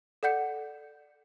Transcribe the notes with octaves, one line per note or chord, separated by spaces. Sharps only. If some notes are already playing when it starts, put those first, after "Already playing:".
A4 D5 F#5 G6 C#7